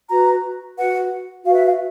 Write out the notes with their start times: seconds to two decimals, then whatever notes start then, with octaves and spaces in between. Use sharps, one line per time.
0.09 F#4 B4 A#5
0.77 F#4 B4 F#5
1.45 F#4 B4 F5
1.55 E5
1.65 F5